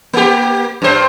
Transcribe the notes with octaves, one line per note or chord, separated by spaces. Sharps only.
A#3 G4
G2 C5